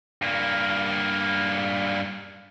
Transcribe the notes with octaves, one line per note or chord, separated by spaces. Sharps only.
G2 A#3